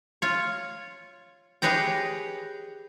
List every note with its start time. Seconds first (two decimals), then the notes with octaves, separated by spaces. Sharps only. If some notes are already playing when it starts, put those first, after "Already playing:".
0.22 F4 C#5
1.62 G4 G#4 B4 C#5 D#5 G5